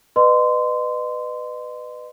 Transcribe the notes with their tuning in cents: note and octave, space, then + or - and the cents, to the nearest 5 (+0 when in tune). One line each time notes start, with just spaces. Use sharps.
B4 +10 D#5 -35 C6 -20